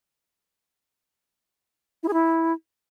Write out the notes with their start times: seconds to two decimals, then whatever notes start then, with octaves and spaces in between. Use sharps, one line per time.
2.03 E4
2.08 G#4
2.13 E4